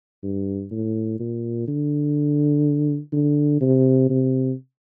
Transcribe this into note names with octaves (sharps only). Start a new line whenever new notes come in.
G2
A2
A#2
D3
D3
C3
C3